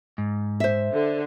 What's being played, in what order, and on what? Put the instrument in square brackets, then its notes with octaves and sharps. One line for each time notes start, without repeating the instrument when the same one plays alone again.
[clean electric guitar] G#2
[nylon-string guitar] C5 E5
[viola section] D3